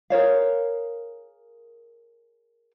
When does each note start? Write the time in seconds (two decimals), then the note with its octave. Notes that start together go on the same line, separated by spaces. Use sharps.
0.10 G#4 A#4 C#5 F5